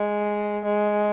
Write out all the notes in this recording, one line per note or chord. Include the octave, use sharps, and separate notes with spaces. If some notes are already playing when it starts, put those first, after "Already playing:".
Already playing: G#3
G#3